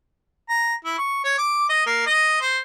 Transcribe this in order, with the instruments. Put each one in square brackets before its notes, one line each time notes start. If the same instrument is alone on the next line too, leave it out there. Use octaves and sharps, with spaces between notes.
[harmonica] A#5
E4
C#6
C#5
D6
D#5
A#3
D#5
C5